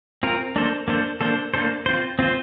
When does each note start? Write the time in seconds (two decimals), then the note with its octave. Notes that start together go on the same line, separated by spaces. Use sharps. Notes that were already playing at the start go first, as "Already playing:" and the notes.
0.23 C4 F4 A#4
0.56 A#3 D4 A4 C5
0.88 A#3 D4 A4 C5
1.21 A#3 D4 A4 C5
1.54 A#3 D4 A4 C5
1.86 C4 F4 C5
2.19 C4 F4 C5